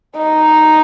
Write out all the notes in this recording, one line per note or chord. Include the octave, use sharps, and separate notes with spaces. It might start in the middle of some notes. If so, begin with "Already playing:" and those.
D#4